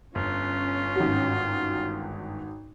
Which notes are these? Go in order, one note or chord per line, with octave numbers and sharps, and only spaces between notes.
G1 C#4 F4
G#1 F#4